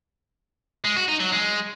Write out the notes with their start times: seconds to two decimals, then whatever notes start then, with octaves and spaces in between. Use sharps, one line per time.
0.85 G#3
0.97 F#4
1.08 D#4
1.20 F#3
1.32 G#3